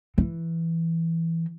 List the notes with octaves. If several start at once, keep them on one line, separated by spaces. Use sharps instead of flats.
E3